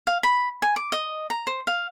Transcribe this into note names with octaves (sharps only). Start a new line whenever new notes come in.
F5
B5
G#5
D6
D#5
A#5
C5
F5